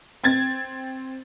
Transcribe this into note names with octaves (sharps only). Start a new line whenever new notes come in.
C4 G#6 A6